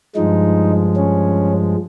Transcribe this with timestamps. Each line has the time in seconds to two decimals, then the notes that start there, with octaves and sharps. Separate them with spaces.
0.15 G2 F3 G#3 D#4
0.96 C#4